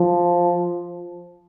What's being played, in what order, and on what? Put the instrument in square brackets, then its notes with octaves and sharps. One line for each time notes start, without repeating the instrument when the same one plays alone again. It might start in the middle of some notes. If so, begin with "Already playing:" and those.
Already playing: [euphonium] F3